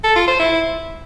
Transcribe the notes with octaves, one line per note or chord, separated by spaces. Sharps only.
A4
F4
C5
E4